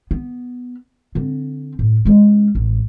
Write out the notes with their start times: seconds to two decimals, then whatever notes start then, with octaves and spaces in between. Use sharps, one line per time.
0.11 B3
1.15 D3 C4
1.79 A2
2.05 G#3 C#4
2.55 A1